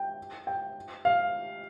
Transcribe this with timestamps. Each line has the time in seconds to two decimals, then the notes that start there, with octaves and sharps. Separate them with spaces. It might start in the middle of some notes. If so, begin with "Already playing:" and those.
Already playing: G5
0.47 G5
1.05 F5